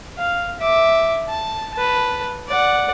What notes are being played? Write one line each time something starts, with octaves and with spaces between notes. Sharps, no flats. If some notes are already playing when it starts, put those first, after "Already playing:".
F5
E5 D6
A5
B4 A5
D5 F#5